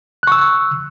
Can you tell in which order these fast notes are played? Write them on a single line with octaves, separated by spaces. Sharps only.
F#6 C#6 E6